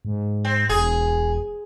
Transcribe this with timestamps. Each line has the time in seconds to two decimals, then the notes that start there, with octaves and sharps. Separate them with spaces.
0.05 G#2
0.45 C4
0.69 E1 G#4